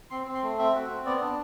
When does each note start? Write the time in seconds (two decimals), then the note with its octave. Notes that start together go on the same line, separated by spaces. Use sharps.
0.11 C4 C6
0.26 C4
0.35 C6
0.43 A3
0.58 C4 E5
0.75 F#4
0.90 C4
1.05 B3 D5
1.21 D4